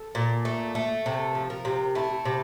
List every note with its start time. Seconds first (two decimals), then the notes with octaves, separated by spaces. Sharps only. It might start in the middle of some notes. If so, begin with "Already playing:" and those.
Already playing: A4
0.15 A#2
0.45 A3
0.75 A3
1.06 C3
1.35 F3
1.50 A#4
1.65 C3
1.95 A3 E4
2.25 C3